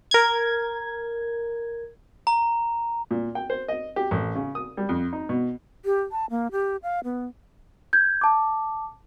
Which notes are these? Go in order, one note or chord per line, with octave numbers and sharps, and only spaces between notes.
A#4 G#6
A#5
A#2
G5
C5
D#5
G4
A1
C#3
D#6
G3
F2
D#4
B2
G4
A5
A#3
G4
F5
B3
G6 G#6
A5 D6